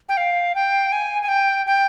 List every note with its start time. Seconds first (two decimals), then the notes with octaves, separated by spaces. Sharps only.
0.09 G5
0.17 F5
0.55 G5
0.92 G#5
1.22 G#5
1.28 G5
1.67 G5